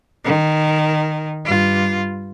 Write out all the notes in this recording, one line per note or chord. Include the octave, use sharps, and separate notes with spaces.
D#3
G2 F4